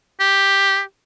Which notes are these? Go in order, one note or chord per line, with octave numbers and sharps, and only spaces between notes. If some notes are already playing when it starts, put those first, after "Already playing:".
G4